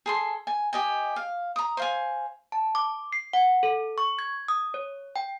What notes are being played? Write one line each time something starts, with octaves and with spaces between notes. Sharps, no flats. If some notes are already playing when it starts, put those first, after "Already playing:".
G#4 A4 C6
G#5
G4 D#5 G#5
F5
A#5 D#6
C5 F5 G#5
A5
D6
C7
F#5
A4
C#6
G#6
D#6
C#5
G5